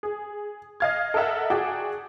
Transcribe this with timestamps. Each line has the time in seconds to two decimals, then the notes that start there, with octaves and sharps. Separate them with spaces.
0.03 G#4
0.80 D#5 F5 G#6
1.14 A4 A#4 D#5 E5 F#5
1.50 F#4 G#4 D5 G5